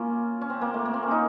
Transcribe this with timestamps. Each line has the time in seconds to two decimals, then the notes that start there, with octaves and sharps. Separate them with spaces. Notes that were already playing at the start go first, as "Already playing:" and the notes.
Already playing: A#3 C#4 F4
0.41 C#4
0.50 C4
0.61 A#3
0.74 A3
0.85 A#3
0.94 C4
1.03 C#4
1.11 D#4